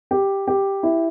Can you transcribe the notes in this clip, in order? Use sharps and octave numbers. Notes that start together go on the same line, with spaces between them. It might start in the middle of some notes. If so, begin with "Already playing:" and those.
G4
G4
E4